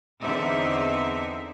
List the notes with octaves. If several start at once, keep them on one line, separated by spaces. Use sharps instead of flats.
E2 D3 C4 D#4 E5